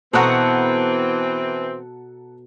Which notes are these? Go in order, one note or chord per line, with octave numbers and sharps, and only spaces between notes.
B2 E3 B3 C4 F#4 A4 F#5 A#5